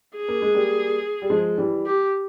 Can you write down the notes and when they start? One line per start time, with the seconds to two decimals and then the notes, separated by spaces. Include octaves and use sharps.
0.16 G#4
0.28 A#3
0.42 G#3
0.54 G3 A#3
1.22 G3
1.30 F3 G#3
1.58 E3 G3
1.86 G4